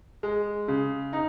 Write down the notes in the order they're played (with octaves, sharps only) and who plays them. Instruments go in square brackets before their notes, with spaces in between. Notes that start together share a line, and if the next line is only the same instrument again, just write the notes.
[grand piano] G#3
C#3
D#4